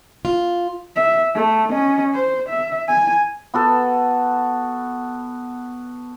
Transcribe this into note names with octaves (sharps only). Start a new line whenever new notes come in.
F4
E5
A3
C#4 D#5
C5
E5
G#5
B3 F#4 A4